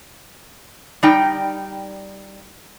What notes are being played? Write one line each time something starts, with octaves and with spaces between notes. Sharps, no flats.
G3 D#4 G5